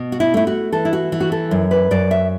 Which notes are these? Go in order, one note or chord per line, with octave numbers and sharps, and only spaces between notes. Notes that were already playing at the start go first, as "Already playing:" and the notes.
Already playing: B2
F#4
E4
A3 E4
F#4
E3 A4
E4
F#4
E3
F#4
A4
F#2
B4
F#2 D5
E5